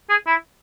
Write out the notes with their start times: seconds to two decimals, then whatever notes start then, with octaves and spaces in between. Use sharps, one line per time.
0.10 G#4
0.27 E4